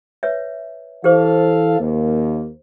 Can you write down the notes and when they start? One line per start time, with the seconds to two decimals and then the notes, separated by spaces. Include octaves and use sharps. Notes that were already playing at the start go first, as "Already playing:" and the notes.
0.23 B4 C#5 E5
1.04 E3 G4 A4 C5 F5 D6
1.80 D#2 A#3